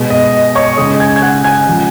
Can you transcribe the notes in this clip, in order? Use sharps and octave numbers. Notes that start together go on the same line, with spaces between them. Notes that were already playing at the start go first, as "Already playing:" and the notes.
Already playing: B2 G#3
D#5
C#5 C#6
C#3 G#3 D#5 D#6
G#5 G#6
G#6
F#5 F#6
G#5 G#6
C#3 F3 G#3